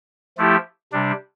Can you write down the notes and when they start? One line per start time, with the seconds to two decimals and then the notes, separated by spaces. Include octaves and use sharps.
0.38 F3 A3 E4 G4
0.93 C3 G3 D4